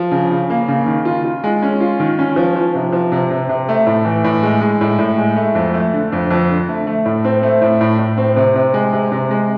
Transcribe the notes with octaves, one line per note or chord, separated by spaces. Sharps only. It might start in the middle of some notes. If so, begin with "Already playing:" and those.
Already playing: F3
C#3
C#3
A#3
C#3
D#3
F4
F4
G#3
C#4
F4
D#3
C#4
F3
F3
C3
F3
C3
C3
C3
A3
A2
E3
A2
G#3
G#3
A2
A2
G#3
A3
F2
A3
D3
F2
F2
D3
A3
A3
A2
C4
A3
A2
A2
A2
C4
C3
C3
G#3
C3
C3
G#3